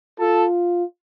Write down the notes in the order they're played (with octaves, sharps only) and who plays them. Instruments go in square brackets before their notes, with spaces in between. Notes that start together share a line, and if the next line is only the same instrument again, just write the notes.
[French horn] F4 [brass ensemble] A4